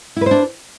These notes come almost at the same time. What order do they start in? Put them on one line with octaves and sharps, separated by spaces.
E4 B4 C5 D4